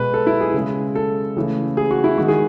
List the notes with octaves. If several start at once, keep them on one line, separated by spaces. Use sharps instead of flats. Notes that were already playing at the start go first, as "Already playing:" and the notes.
Already playing: B2 G#3 B4
A4
E4
G#4
C#3 G#3
A4
C#3 E3 A3
G#4
F#4
E4
D#3 G#3 F#4
G#4